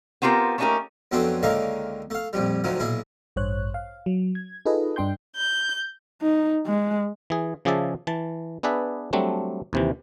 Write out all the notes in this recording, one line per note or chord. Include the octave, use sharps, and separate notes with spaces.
B3 C4 F4 G4 A#4 C5
A3 A#3 C#4 D#4 G4 A#4
F2 F#3 A3 B3 C4 D4
C#2 D3 D#3 A#3 C#5 F5
A3 F5
A#1 F2 G3
D2 D#3 F3 F#3
B1 A#2 E4 G#4
A1 G2 C5 C#5 F#6
F5
F#3
G#6
D#4 F4 G#4 A4 B4 D#5
G2 D4 G5 C6 G6
G6
D#4
G#3
E3 G#4
C#3 F3 G#4 D5 E5 A5
E3 A5
B3 D4 G#4 B4 D5 E5
F#3 G3 A3 C4 D4
D#2 C3 E3